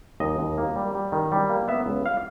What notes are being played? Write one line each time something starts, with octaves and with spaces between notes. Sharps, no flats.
D#2 D#5
D#2
A#3
G3
G3
D#3
G3
A#3
B3 E5
C#2
F5